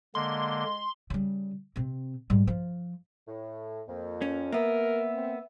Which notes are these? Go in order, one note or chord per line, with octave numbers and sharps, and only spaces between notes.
D3 G#3 A#3 C6
C#3 G3
C3 C4
G#2 G3
F3
A2
F2 A#3
C#4
A#3 B3 A#4 E5
C4